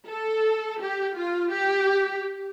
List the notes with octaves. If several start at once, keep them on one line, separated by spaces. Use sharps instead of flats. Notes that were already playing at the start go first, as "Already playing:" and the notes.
A4
G4
F4
G4